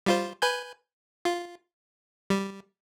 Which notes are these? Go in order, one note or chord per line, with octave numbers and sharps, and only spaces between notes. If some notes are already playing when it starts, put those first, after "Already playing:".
G3 F4 C5
B4 G#5 G6
F4
G3